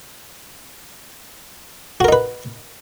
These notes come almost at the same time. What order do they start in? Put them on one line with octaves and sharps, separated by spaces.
F#4 A#4 D#4 B4